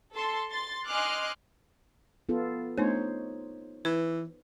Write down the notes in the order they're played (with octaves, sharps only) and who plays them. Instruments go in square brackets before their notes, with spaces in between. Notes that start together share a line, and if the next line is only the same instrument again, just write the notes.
[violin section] A4 A5 C6
C6 A6
D#5 G#5 C6 D6 F6 F#6
[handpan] B3 F4 A4
[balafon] A3 B3 D4 [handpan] D#4 C5 C#5
[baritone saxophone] E3 [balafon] B4